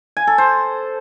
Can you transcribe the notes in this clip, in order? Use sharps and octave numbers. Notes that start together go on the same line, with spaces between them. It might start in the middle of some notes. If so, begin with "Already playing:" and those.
G#5
A4
C5